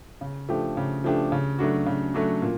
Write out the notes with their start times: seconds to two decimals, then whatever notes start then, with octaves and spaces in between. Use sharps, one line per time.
0.21 C#3
0.49 F3 A3 D4 G4
0.77 C#3
1.04 F3 A3 D4 G4
1.32 C#3
1.59 F#3 A3 D4 F#4
1.86 C#3
2.14 F#3 A3 D4 F#4
2.42 A#2